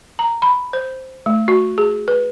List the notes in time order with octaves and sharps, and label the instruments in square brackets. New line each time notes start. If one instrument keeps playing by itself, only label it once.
[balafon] A#5
B5
C5
A3
F#4
G#4
B4